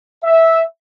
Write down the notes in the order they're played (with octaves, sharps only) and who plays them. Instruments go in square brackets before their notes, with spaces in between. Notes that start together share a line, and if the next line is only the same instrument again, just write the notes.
[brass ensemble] E5